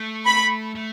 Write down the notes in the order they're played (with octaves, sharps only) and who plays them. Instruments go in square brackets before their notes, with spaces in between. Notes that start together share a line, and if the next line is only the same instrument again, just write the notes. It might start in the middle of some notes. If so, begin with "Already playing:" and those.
Already playing: [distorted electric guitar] A3
[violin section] B5
[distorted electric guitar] A3